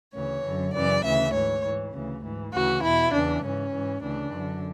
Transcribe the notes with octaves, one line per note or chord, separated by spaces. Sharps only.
D2 C#3 E3 C#5
F#2 D3
F#2 C#3 E3 D5
D2 C#3 E3 E5
G#2 E3 C#5
G#2 E3
D2 C#3 E3
G#2 E3
D2 C#3 E3 F#4
E2 B2 E4
E2 C#3 E3 D4
G#2 E3 C#4
G#2 E3
D2 C#3 E3 D4
F#2 D3